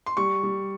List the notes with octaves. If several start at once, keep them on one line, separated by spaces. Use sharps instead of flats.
C6
G3 C#6
G3